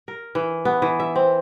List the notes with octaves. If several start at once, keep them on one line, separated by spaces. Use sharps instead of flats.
A#4
E3
B3
E3
E5
C4